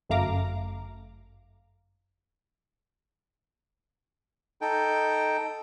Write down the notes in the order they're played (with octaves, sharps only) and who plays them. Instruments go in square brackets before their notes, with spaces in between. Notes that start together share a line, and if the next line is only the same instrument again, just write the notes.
[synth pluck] G1 F#2 A3 F5 A#5 D6
[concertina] D#4 A4 G5